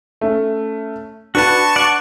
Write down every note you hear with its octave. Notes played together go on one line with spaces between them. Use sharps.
A3 C#4
D4 F#4 B4 A5 B5 C#6
D5 F#5